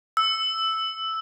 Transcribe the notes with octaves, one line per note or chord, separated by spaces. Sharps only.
E6